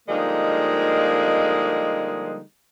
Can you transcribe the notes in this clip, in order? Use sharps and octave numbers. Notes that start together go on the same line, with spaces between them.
D3 F3 G3 G#3 A#3 D#4